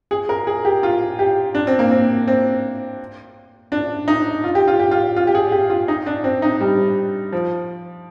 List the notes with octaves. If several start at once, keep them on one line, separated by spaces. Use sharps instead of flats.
G#4
A#4
G#4
G4
F4
G4
D4
C4
A#3
C4
C4
D4
D#4
F4
G4
F4
G4
F4
F4
G4
G#4
G4
F4
D#4
D4
C4
D#4
G3
F3